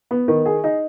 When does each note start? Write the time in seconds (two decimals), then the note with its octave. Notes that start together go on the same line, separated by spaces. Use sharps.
0.11 B3
0.28 D#3
0.46 G#4
0.64 D#4